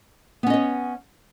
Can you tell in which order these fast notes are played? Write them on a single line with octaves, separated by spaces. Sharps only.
B3 C#4 D#5 C#5